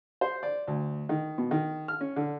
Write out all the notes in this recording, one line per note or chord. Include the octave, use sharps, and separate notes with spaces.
C5
D5
D2
D#3
B2
D#3
F6
C#4
D3